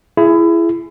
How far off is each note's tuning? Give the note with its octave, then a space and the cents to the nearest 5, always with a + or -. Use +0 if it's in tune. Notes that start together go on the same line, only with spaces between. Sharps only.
E4 +25 G#4 +5